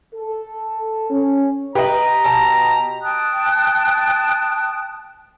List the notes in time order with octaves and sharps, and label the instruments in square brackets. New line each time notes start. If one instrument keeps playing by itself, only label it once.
[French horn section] A4
C#4
[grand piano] G4 D#5 [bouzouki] B4 [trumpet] A#5
[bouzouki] B2 A5
[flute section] G5 A5 D#6 F#6